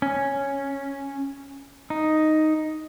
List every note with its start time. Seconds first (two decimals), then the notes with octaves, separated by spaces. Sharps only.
0.02 C#4
1.90 D#4